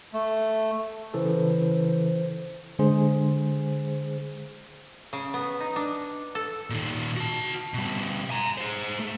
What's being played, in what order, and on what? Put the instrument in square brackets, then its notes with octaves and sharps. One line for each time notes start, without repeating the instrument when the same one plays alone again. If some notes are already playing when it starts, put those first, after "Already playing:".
[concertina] A3
[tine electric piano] C#3 E3 A4 [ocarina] C5
[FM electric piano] D3 G#3 G#4 C5
[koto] C#3
B3
D#4
D4
A4
[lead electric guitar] A#2 D#3
F#4 A5
B2 G3
G#5 A#5
G#4 C5
A3